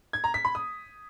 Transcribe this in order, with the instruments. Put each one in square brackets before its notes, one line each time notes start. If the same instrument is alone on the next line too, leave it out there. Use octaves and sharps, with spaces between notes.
[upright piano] G#6
A#5
B6
B5
D#6